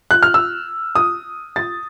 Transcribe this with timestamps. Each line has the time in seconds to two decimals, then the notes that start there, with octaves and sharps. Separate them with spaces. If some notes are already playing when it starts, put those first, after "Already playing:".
0.11 F#6
0.23 F6
0.34 E6
0.95 D#6
1.56 A6